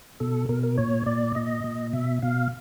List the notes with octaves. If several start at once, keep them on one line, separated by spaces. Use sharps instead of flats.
B2 A4
B2 A#4
A#4
A#2 C#5
A#2 D5
A#2 D#5
A#2
B2 E5
B2 F5